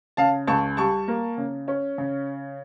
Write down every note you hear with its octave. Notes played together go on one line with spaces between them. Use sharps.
C#3 F5 A5
C#2 A5 C#6
G3 A5 C#6
A#3
C#3
C#4
C#3